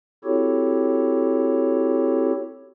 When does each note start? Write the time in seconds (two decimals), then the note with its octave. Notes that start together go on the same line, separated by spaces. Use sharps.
0.24 C4 E4 F#4 G4 A4 C#5